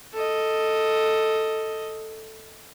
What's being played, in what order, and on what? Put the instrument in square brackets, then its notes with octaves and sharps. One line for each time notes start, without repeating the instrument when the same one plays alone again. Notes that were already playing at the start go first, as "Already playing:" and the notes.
[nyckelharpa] A4 D#5